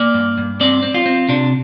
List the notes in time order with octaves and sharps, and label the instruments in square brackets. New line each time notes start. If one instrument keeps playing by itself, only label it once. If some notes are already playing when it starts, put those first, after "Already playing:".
Already playing: [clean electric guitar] A#3 D5
G2
G2
C4 D5
C4
F4
C4
C3 D4